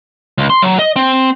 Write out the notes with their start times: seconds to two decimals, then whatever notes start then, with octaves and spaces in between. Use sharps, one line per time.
0.38 C#2
0.50 C6
0.62 F#3
0.79 D#5
0.96 C4